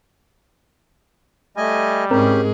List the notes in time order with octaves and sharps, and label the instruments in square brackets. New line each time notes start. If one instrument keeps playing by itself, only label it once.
[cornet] G3 [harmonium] A3 D#5 G#5
[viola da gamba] G#2 G#4 [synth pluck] C4 A#4 [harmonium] C#4 G4